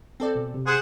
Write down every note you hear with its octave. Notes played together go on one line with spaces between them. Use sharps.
C4 A4 D5
B2
C3
G#4 C5 F#5